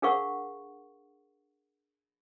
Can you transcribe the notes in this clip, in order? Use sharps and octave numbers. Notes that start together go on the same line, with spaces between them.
D4 G#4 A#4 F5 F#5 C#6